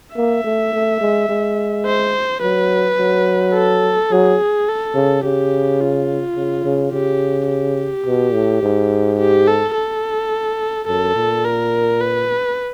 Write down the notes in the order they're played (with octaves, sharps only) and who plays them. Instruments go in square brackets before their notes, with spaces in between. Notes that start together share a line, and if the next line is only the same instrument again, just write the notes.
[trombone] A#3 [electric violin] E5
[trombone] A3
A3
G#3
G#3
[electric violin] C5
[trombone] F#3 [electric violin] B4
[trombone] F#3
[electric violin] A4
[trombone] F#3 [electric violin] G#4
[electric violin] A4
[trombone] C#3
[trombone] C#3 [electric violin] G4
[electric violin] F4
[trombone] C#3
C#3
[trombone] C#3 [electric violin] G4
[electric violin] G4
[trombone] B2
A2
G#2
[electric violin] G4
A4
A4
[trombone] F#2 [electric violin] A4
[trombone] A#2
[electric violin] A#4
B4